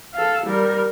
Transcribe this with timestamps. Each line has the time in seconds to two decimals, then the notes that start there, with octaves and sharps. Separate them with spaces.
0.14 A4 F5
0.46 G3 A#4